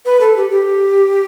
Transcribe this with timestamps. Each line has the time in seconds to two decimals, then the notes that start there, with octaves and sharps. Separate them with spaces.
0.06 B4
0.21 A4
0.37 G4
0.51 G4